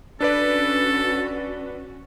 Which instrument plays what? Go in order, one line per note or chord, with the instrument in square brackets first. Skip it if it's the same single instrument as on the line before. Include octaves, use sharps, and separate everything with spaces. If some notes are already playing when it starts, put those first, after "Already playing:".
[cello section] C#4 F#4 [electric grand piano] D4 B4 D5 [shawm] A4